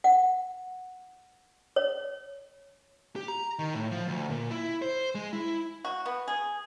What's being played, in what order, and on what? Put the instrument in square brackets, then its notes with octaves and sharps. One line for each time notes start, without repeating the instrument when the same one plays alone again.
[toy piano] F#5
C#5
[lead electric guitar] G4
A#5
D#3
A2
F3
D2
A#2
E4
C5
G#3
E4
[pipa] F#4
B3
G#4